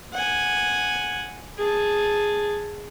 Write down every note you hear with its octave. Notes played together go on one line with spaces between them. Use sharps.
F#5 G#5
G#4 A5